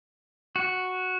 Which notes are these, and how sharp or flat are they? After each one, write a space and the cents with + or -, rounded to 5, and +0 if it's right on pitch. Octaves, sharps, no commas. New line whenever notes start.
F#4 -5